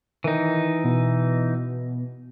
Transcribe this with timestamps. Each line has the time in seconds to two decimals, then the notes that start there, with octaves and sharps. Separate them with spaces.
0.24 D#3 E3 D#4
0.84 B2